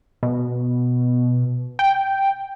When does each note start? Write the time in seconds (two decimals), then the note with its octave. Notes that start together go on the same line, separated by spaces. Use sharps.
0.23 B2
1.79 G5